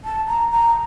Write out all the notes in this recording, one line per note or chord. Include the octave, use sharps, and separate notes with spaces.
A5
A#5
A#5